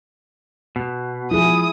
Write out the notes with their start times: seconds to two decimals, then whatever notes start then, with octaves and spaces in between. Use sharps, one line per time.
0.76 B2
1.31 F3 E4 G#4 D#6